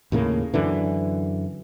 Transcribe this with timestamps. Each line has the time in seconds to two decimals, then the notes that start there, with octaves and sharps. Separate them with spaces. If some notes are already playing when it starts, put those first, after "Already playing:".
0.12 D#2 A2 C#3 A#3
0.54 F#2 D3 E3